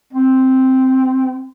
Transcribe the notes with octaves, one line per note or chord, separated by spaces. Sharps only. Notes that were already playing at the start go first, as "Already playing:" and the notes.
C4